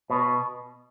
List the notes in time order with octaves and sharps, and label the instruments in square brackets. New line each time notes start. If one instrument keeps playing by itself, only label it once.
[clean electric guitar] B2